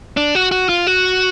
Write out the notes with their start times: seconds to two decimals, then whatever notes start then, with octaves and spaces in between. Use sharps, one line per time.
0.17 D4
0.35 F#4
0.52 F#4
0.69 F4
0.87 F#4